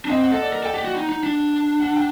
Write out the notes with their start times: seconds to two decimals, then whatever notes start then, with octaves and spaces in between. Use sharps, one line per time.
0.05 D4
0.10 C4 D#5
0.21 F#5
0.31 A4 D#5
0.42 D5
0.53 A#4
0.63 A4 G5
0.74 G4 F#5
0.85 F#4
0.95 D#4
1.09 D#4
1.23 D4
1.80 F#5
1.96 G5